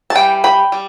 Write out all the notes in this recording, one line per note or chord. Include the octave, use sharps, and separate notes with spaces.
A5
E3 G3 G5
G5 B5
G3